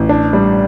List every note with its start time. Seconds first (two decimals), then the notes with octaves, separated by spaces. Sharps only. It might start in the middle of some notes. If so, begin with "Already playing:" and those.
Already playing: A1
0.09 D4
0.33 G3